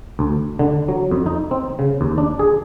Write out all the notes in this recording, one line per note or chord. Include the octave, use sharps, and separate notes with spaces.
D2
D3
F#3
F2
D#4
C4
C#3
D#2
D4
G#4